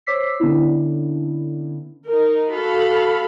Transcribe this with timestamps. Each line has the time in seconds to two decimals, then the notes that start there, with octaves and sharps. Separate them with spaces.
0.06 C5 C#5 D6 E6 B6 C7
0.40 D3 B3 C#4 D4 E4
2.07 D#4 A#4
2.52 F#4 A4 F5 B5